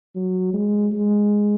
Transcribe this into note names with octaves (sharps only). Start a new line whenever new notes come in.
F#3
G#3
G#3